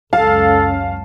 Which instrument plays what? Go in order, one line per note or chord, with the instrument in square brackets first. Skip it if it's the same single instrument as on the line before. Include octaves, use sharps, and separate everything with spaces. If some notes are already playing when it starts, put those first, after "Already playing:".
[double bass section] C#2 F#2 C#4 [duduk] A4 [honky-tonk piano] F5 [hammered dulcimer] A5